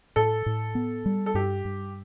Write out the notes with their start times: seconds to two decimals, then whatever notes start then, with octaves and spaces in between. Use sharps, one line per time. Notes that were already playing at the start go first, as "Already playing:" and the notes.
0.16 A2 A4
0.46 A2
0.75 B3
1.06 G3
1.26 A4
1.34 G2 G4
1.65 G2